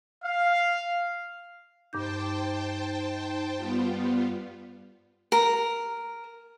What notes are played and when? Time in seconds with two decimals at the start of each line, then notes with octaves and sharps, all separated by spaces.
0.23 F5
1.93 G2 D#4 C5 G5 A5 D6 G6
3.57 G3 B3 F4
5.32 A#4